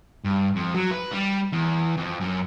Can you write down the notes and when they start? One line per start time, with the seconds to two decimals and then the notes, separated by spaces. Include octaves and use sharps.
0.24 G2
0.55 F2
0.74 F#3
0.91 B4
1.12 G3
1.53 E2
1.97 F2
2.21 F#2